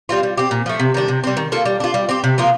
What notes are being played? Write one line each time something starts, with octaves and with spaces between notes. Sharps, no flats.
G3 C4 F4
G3
C4 G4
A#2
F3 A3
C3
D#3 G3 D4
C3
G3 C4
D#3
A#3 F4 A4
G3
D4 F4
G3
C4 G4
C3
F3 A#3 F4